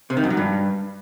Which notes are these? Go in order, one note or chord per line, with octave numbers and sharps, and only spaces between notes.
C3
D#3
F#2
F#3
G2